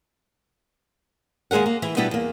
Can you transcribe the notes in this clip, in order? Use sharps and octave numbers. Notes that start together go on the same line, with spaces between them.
D#2 G#3 G#4 A#4 F#5
A#3
E3 E4
B2 G3 B3 D4 E4 G4
E2 A#3